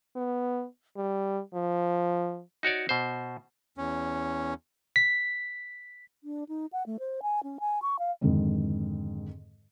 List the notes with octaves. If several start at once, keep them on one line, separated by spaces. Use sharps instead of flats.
B3
G3
F3
D#4 F#4 C#5 D5
B2 C5
E2 C#4
B6
D4
D#4
F#5
A3
C5
G#5
C#4
G#5
C#6
F5
F2 G#2 D3 D#3